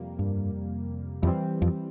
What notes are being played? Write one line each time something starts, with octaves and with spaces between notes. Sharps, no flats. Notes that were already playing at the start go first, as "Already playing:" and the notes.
Already playing: F2 C3 G3 A#3
G2
F2 E3 G3 C4
F2